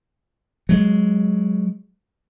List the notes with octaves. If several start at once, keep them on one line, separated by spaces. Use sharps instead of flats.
F#3 G#3